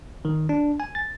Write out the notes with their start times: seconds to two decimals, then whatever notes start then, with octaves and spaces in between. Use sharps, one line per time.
0.25 D#3
0.49 D4
0.80 G#5
0.95 A6